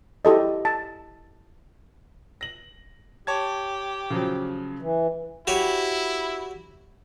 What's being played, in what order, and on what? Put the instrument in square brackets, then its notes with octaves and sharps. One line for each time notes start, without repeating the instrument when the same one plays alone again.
[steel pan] E4 G4 A4 D#5
A5
[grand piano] A#6 F#7
[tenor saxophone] G4 [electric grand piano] C#5 A5 G#6
[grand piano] C#3 F3 F#3
[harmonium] E3
[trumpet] E4 [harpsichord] F#4 G4 C#5